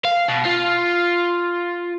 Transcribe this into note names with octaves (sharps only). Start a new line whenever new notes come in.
F5
B2
F4